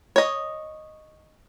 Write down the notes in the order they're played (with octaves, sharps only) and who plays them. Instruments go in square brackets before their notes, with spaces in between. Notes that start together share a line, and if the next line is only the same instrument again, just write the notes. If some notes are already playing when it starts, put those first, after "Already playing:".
[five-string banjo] C#5 D#5